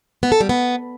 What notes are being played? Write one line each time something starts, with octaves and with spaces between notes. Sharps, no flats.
B3
A4
G3
B3